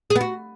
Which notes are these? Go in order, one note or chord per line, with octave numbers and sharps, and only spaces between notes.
G#4
B3
F#4